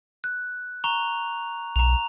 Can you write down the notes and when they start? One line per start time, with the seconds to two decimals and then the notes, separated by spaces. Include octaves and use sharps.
0.24 F#6
0.84 A#5 C#6 F7
1.76 B1 A#5 F7